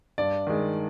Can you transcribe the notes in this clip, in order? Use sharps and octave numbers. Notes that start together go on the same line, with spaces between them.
G2 D5
D#3 G#3